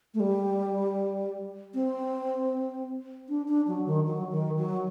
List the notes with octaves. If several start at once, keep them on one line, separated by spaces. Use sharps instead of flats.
A3
G3
C4
D4
D4
F#3
D#3
F#3
D#3
F#3